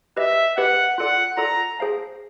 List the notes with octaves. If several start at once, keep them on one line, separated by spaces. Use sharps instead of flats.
G4 B4 D#5 E5
G4 B4 D#5 F#5
F4 A4 D5 F#5
F4 A4 D5 A#5
G#4 C5 F5 A5